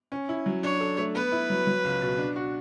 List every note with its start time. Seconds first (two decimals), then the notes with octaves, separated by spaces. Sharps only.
0.12 C#4
0.29 E4
0.46 F#3
0.63 D4 C#5
0.80 A4
0.98 A3
1.15 B3 B4
1.32 E4
1.50 F#3
1.67 F#3
1.84 C#2
2.02 B2
2.18 D4
2.36 F#4